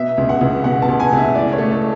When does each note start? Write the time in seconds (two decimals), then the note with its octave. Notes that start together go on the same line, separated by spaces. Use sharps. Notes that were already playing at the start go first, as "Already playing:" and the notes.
Already playing: B2 E5
0.17 C#2
0.29 F#5
0.41 C#2
0.64 B2 F#5
0.82 A5
0.88 C#2
1.00 G#5
1.12 C#2
1.18 E5
1.35 A2 D5
1.52 C#5
1.58 A3
1.71 A4